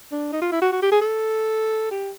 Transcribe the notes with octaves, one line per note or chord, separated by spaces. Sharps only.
D4
D#4
F4
E4
F#4
F#4
G4
G#4
A4
G4